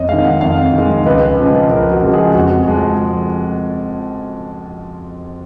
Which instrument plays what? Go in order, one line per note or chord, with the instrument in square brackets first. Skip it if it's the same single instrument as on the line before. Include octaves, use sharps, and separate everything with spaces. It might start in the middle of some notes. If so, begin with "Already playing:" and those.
Already playing: [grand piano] F2 C#5 D#5
D#3 G#3 F5
F#5
F2 F5
D#3 G#3
C#2 B4
C#3 F3 G#3
C#2 A#4
F#4
C#3 F3 G#3
G#4
F2 F#4
F3 G#3